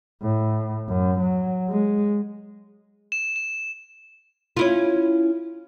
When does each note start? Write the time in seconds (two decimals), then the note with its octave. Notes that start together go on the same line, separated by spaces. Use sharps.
0.23 A2
0.89 F#2
1.21 F#3
1.70 G#3
3.12 E7
3.36 E7
4.57 C#4 E4 F4